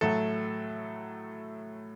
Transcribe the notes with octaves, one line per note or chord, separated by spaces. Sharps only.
A2 F#3 A3 A4